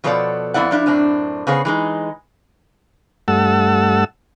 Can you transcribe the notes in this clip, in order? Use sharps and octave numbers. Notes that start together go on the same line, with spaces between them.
B2 F3 B3 A4 C#5 D5
F2 B3 E4 D5 F#5
F3 D4 E4
F#2 A2 C4 D4
C#3 B3 G#4 C5 C#5
E3 G#3 D#4
G2 A3 F#5 A5 E6